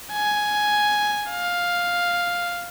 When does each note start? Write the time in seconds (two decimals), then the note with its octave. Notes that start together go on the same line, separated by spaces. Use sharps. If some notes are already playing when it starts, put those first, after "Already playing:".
0.13 G#5
1.30 F5